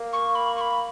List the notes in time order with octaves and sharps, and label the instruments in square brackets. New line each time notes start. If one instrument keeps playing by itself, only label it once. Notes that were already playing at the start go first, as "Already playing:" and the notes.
Already playing: [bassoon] A#3
[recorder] C#6
B5
C#6
B5